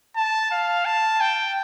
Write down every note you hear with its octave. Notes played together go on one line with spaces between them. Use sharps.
A5
F5
A5
G5